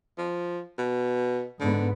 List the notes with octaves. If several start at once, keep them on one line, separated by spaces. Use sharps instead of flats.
F3
B2
G#2 D3 B3